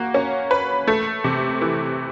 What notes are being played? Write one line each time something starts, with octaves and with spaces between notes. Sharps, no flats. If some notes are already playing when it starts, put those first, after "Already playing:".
Already playing: A#3 F#4
C#4
B4
A3
C3
E3